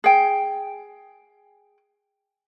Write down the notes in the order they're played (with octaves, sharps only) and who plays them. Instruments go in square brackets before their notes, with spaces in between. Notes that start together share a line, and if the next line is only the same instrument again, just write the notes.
[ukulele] G#4 G5